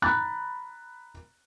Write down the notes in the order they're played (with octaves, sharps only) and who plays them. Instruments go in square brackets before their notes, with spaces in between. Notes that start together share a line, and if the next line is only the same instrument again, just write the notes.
[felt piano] A#5 B5 F#6 A6